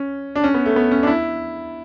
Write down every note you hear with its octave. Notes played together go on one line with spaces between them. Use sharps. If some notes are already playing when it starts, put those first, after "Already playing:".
Already playing: C#4
D4
C#4
B3
A3
B3
C#4
D4
E4